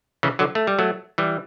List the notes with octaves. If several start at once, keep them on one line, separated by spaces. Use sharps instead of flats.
C#3 E3
D3 F#3
A3
G3
F#3 A3
E3 G3